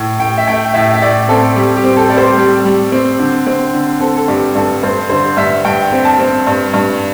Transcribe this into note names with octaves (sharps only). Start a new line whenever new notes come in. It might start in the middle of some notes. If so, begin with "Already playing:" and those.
Already playing: A2
A2 G5
E5
A3 G5
A2 E5
E5
A2 D5
C4 A4
G3 G4
G4
C4
A4
G3 D5
C5
G3
G3
C4
D3
C4
D3
C4 A4
A4
G2 G4
G2 A4
G2 C5
D3 C5
G2 E5
G2 G5
C4
A5
C4
G2
G2